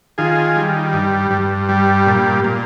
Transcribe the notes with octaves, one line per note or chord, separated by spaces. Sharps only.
D#3 F4 G#4
G3
G2
G2
G3
A#2
A#2